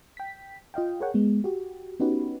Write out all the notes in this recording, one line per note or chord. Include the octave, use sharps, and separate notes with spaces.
G5 B6
F4 D#5 F5 G5
G#4 A#4 C#5 F#5 G5
G#3 B3
F#4 G4
B3 C#4 D#4 F#4 G4 B4